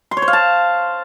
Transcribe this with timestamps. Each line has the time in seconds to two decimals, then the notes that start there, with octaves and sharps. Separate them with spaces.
0.11 C6
0.17 C#5
0.22 C5
0.28 F5
0.33 A5